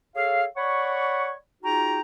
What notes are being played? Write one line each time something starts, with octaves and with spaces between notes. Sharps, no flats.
G#4 A4 C#5 F5
C#5 D5 F#5 B5 C#6
D#4 F4 F#4 G#4 G5 A#5